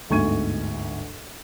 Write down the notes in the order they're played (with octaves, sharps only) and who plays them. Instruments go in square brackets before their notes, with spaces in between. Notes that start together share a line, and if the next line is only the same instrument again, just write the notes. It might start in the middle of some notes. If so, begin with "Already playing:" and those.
[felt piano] G1 D2 G#2 C#6 G#6 D#7